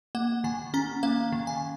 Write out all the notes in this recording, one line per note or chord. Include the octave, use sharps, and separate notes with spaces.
A#3 F#5
D#3 G#5
C#4 A#5
A#3 F5
D#3
G#5